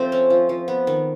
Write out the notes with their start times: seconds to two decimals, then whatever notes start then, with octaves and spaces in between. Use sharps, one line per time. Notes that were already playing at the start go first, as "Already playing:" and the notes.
Already playing: F3 A3 C4 C5
0.12 C#4
0.30 F3
0.49 F3
0.68 B3
0.87 D#3